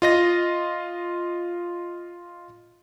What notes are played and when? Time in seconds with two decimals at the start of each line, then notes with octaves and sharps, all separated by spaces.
0.02 F4 D#5 A#6